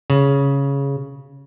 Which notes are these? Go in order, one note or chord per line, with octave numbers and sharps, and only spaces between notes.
C#3